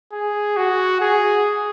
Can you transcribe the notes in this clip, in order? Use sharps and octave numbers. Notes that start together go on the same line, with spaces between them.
G#4
F#4
G#4